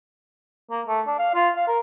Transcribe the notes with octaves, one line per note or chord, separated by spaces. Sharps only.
A#3
A3
D4
F5
F4
F5
A#4